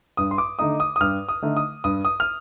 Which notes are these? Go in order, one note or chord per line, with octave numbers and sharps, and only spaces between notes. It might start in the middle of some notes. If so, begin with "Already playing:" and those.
G2 D#6
C6
D6
D3 A3 D#4 D#6
D#6
D#6
G2 F6
D#6
D3 A3 D#4
D#6
G2 D#6
D#6
F6